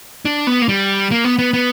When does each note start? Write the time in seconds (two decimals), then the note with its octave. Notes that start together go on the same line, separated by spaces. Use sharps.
0.25 D4
0.47 B3
0.62 A#3
0.69 G3
1.11 A#3
1.24 B3
1.39 B3
1.53 B3